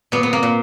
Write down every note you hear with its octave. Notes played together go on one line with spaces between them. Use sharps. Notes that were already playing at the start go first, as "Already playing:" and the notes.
A#2 B3
B3
A#3
A#2